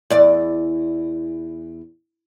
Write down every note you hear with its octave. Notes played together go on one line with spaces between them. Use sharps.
E2 D5